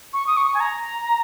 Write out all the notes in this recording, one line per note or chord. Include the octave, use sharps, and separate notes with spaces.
C#6
D#6
C#6
G#5
A#5